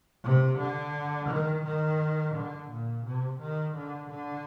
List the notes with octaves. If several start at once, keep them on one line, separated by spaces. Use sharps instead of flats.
C3
D3
D#3
D#3
D3
A#2
C3
D#3
D3
D3